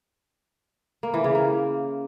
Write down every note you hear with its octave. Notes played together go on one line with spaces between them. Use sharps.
A#3
E3
C#3
A#3